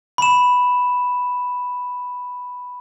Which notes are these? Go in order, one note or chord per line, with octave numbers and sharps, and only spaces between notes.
B5 E7